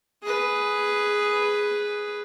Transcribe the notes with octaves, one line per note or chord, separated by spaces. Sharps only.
G#4 B4